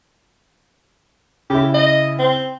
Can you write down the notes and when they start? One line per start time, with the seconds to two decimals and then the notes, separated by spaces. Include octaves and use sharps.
1.50 C#3 E4 G4
1.74 D#5
2.19 C4